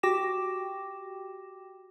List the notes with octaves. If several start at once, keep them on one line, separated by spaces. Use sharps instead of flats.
F#4 G4 G5 D6 A#6 E7